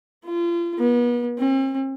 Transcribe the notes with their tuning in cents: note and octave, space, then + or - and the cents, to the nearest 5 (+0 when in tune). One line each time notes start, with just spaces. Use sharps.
F4 -35
B3 -35
C4 +45